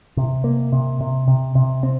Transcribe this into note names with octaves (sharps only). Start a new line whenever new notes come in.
C3
A#3
C3
C3
C3
C3
C4